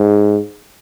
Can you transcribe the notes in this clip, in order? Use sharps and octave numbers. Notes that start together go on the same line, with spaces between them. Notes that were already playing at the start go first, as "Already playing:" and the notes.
Already playing: G#2